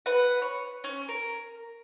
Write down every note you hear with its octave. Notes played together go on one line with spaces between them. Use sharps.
B4 F#5
C#5
C#4
A#4